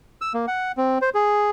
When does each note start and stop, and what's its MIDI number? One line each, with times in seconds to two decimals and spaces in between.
0.21 0.33 88
0.34 0.46 58
0.47 0.72 78
0.77 0.98 60
1.02 1.10 72
1.14 1.50 68